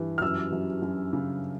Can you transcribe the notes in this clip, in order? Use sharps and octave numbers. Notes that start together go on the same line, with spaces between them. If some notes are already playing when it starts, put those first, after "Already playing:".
Already playing: G2 E3
F6
F#2 E6
F#2
F#2
C#3